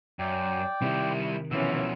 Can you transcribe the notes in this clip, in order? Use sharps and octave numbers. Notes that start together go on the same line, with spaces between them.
F#2 D5 G5
C3 D#3 G3 E4
B2 E3 F3 C#4 E6